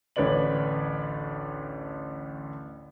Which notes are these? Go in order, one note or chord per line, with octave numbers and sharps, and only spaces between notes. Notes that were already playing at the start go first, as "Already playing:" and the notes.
A1 D2 B4 C#5 D5 F#7